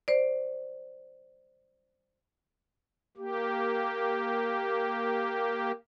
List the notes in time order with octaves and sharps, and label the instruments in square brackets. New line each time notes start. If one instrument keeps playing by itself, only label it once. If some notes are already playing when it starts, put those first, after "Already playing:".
[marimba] C5 D5
[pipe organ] A#3 G4